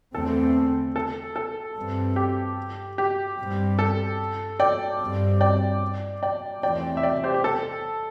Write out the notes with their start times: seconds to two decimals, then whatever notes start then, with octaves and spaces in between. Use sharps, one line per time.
0.14 E2 D3 A3 C4 A4
0.96 A4
1.36 A4
1.76 G2 E3 G3 C4
2.16 G4
2.98 G4
3.39 G2 G3 C4
3.79 A4
4.60 D5 G5
5.01 G2 G3 C4
5.41 D5 G5
6.23 D5 G5
6.63 E2 C3 E3 A3 C4 D5 G5
6.97 E5
7.03 D5 G5
7.24 G4 C5
7.34 G4
7.44 A4